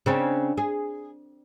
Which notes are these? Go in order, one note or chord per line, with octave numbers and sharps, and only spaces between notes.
C#3 C4 D4
G#4